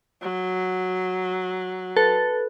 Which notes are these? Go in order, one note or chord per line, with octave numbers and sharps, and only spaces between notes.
F#3
A4 B4